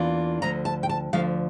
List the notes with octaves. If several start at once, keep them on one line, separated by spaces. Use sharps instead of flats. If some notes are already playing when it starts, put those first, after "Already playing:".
Already playing: E2 E3 A#3 D4 F4
D2 D3 F3 A#5
A5
G5
A5
D2 D3 F3 F5